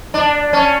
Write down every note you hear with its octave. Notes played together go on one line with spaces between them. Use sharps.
D4
C#4